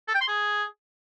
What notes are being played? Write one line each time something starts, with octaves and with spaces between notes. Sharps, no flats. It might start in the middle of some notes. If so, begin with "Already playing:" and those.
A4
G5
C6
G#4